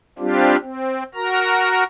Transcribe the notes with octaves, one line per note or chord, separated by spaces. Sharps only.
G3 C4 D4 F4 G4
C4
F#4 A#4 A#5